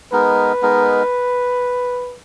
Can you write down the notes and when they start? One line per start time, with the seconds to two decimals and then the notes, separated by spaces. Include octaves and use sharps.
0.12 G#3 B3 D#4 A#4 B4
0.62 G#3 B3 D#4 A#4